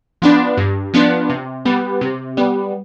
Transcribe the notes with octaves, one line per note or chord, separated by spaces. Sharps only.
F3 B3 D4
G2
F3 B3 D4
C3
G3 B3
C3
G3 B3